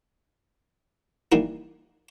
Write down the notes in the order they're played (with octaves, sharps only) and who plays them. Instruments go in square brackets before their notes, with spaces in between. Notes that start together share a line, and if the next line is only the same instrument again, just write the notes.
[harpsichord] E3 G3 A#3 D#4 E4